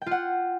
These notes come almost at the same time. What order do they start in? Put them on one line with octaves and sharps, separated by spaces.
G5 F4 F#5